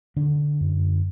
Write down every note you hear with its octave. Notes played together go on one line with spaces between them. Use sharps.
D3 D4
F#2